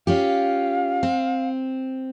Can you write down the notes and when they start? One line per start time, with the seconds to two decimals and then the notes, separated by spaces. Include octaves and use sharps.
0.07 C#4 F4 G4 F5
1.03 C4